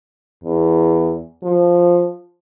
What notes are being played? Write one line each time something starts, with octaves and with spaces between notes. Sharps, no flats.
E2
F3